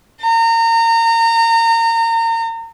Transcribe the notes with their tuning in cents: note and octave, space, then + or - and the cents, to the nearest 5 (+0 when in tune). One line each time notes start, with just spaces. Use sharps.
A#5 -30